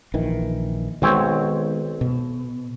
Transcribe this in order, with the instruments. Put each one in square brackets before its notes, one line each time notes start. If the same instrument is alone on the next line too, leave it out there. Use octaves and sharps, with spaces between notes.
[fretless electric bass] A#1 D#3 E3
[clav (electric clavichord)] B1 C4 C#5 [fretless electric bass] D#3 G#3 B3
[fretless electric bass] B2